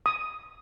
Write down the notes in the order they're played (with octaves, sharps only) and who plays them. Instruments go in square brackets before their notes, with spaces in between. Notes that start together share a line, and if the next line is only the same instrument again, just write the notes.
[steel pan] D#6